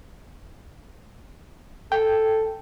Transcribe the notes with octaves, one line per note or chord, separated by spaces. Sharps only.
A4 G5